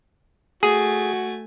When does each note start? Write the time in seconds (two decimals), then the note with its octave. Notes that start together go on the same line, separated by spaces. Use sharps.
0.63 A3 F#4 G#4 G#5